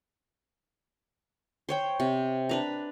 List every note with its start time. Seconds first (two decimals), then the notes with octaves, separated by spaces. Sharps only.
1.69 C5 C#5 G5
2.00 C3
2.49 D4 B4 A#5